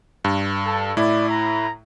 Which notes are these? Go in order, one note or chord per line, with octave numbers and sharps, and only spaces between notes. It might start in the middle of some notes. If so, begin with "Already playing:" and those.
G2
A4
A2 E4 D5
A#5